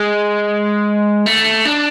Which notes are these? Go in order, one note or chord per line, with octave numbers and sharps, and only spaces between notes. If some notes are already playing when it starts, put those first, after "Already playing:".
Already playing: G#3
A3
D4